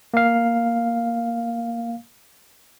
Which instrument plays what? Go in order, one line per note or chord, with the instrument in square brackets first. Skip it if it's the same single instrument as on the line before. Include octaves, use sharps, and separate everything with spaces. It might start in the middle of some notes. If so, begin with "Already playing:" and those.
[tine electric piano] A#3 F5